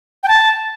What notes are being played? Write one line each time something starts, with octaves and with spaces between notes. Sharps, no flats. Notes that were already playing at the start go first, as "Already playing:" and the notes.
G5
A5